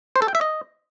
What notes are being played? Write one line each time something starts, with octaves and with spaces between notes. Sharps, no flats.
C5
A4
G5
E5
D#5